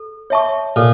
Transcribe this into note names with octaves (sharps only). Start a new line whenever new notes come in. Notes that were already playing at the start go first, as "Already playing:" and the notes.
Already playing: A4
C#5 E5 A5 C#6
A#2 A4